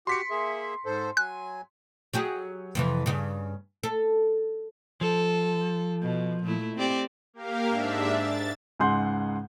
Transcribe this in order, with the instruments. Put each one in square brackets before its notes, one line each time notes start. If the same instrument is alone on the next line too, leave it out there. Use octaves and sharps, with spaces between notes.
[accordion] F#4 G4 [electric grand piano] C6 B6 C#7
[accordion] A#3 G#4 E5
G#2 A4 C5
[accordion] F#3 G#5 [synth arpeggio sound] F#6
[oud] F#3 G4 G#4
F2 C3 E3
G2 C#3
A4
[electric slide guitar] F3 [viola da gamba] A4
[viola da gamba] B2
A#2 A3 E4
C4 G4 D5
[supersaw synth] A#3 G4 A#4 F5
G#2 D4 E5
A6
[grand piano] C#2 G#2 G#4 F#5 C6 G6